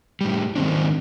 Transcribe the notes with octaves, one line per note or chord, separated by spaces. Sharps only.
A2 G3
G#2 D#3 C4 D4